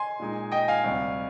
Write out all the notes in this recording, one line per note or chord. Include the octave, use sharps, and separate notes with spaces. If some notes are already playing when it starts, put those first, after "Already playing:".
Already playing: G#5 C6
A#2 G#3 D#4
D#5 G5
F5 G#5
D2 C3 G3